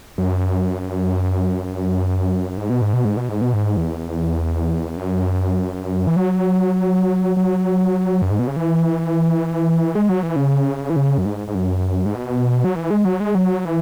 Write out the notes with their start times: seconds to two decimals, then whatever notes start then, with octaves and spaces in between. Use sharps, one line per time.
0.18 F#2
2.57 G#2
2.70 B2
2.82 G#2
2.93 B2
3.05 G#2
3.17 B2
3.29 G#2
3.41 B2
3.53 G#2
3.77 E2
4.97 F#2
6.07 E3
6.16 F#3
7.37 F#3
8.22 F#2
8.31 G#2
8.39 B2
8.47 C#3
8.56 E3
9.95 G#3
10.09 F#3
10.23 E3
10.36 C#3
10.90 E3
10.96 C#3
11.18 F#2
11.25 G#2
11.48 G#2
11.55 F#2
12.06 G#2
12.15 B2
12.64 F#3
12.75 E3
12.90 G#3
13.05 F#3
13.20 G#3
13.35 F#3
13.65 E3